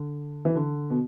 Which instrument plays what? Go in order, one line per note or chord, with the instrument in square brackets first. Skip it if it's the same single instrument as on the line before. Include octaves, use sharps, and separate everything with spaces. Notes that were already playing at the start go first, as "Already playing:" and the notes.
Already playing: [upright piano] D3
E3
D3
B2